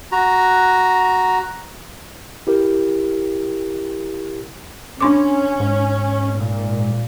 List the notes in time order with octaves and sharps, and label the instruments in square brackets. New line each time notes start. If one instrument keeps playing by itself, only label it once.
[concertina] F#4 A#5
[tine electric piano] E4 G4 A#4
[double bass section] C#4 [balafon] D4 C6 D6
[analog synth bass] G#2
[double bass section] A#2